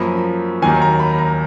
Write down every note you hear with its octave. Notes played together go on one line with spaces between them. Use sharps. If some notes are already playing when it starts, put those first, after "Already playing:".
Already playing: F#2 F3 A#3 B5
D#2 D#3 F#3 A#3 G#5
A#5
B5
A#5